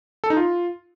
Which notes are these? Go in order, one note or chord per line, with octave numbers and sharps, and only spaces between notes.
A4
D#4
F4